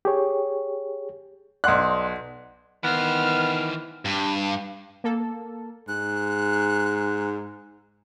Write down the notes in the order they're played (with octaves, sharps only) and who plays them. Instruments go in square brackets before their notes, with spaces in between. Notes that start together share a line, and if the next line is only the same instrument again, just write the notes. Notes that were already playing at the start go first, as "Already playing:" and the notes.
[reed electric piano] G4 G#4 C#5
[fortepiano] B1 F#6 [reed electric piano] D5 F#5 C6
[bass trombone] D#3 [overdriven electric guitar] E3 C5 [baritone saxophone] B3 [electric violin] F6
[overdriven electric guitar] G2
[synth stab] A#3 A4
[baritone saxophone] G#2 [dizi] F#6